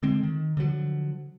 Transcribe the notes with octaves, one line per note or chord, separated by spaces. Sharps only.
D3 G#3 C4
D#3
D3 F3 F#3